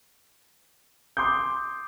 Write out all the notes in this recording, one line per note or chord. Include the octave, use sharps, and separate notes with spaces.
C6 D6 D#6 G6